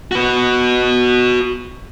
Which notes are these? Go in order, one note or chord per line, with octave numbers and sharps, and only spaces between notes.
F#4 B4